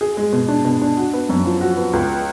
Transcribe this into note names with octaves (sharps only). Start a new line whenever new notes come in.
G#4
G#3
B2
D4
B2
D4
F#4
B3
F#2
F3
F#4
B3
C#2